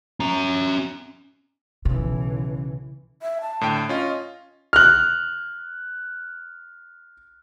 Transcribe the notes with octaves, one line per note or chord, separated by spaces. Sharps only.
C#4 A#5
B1 C#3 E3
E5
A5
A2 D3 G5
C#4 F4 D#5
F6 F#6